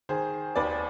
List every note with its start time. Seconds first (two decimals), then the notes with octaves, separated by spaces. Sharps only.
0.09 D#3 G#4 C5
0.55 D#2 B4 D5